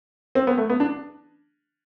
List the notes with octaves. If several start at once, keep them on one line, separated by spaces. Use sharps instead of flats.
C4
B3
A3
B3
D4